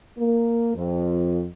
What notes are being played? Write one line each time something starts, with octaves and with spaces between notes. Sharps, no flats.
A#3
F2